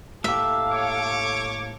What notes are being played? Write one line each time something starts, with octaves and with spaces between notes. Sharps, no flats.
A2 A#3 G4 A4 E5 F5
C#5 D6